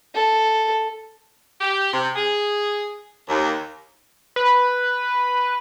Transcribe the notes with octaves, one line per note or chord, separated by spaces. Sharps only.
A4
G4
C3
G#4
D#2
B4